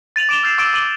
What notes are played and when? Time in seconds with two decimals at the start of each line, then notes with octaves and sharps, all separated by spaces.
0.16 A6 D#7 F7 F#7
0.29 D6 D7 E7 F7 G7
0.43 E6 F6 G6 A6 C7 F7
0.58 C#6 D6 E6 A6 D7 G7
0.74 D6 D#7 F#7 G7